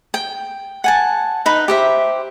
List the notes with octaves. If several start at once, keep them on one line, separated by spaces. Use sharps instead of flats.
G5
F#5 G#5 A5
D#4 B4 B5
G4 C5 E5